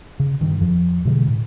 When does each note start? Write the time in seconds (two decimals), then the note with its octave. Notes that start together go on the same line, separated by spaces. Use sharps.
0.20 C#3
0.41 G2 D#3
0.61 F2 F3
1.05 B2 D3 E3 G#3
1.28 A2